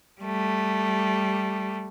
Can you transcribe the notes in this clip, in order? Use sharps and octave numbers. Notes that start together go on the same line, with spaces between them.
G3 A3